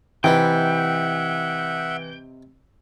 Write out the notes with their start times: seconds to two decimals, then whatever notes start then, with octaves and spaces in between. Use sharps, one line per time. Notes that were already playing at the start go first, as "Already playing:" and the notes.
0.24 C3 E3 D#4 B4 E5 F#5 G5